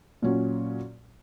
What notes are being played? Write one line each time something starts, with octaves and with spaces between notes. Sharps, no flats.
A#2 F#3 C#4